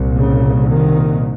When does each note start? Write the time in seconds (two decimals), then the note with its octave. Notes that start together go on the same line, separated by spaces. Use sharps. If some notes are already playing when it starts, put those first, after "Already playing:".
Already playing: C2 A#2
0.17 C#3
0.70 D#3